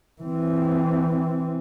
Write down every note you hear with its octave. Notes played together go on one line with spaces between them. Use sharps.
E3 C4